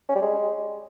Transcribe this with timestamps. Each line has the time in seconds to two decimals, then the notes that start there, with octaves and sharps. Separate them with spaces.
0.09 C#4
0.15 G3
0.22 G#3